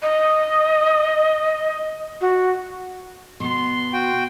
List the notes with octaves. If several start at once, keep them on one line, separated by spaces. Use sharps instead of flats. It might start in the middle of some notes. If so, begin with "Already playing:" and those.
D#5
F#4
B2 B3 C6
F#4 G5